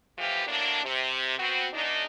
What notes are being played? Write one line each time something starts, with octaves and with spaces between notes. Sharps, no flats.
A2 E3 F3 B3 F4 G4
A2 F#3 A#3 D4
C3
B3 C4 F#4
E2 D4 D#4